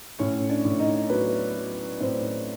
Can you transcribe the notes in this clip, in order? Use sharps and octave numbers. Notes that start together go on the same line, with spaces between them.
A2 C#4 C#5
D4 D5
A2
D#4 D#5
F#3 B3 B4
F#3
A2 C4 C5